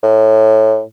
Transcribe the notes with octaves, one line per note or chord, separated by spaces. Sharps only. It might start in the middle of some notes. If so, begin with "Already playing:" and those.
A2